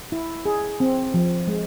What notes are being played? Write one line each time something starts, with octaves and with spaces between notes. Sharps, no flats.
E4
G#4
C4
F3
G#3